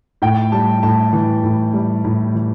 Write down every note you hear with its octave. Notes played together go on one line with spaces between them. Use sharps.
A2 G5
G3 A5
A2 A5
E3
A2
G3
A2
E3